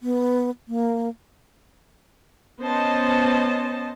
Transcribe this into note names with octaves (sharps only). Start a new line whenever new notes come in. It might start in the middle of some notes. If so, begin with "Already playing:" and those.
B3
A#3
B3 C#4 C5 D#5 A5